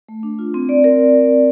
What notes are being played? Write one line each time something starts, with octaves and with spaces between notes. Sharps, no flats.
A3
D4
F4
C4
D5
A#4